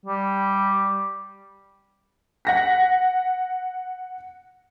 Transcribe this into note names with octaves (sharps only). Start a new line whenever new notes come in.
G3
F#5 A#6 B6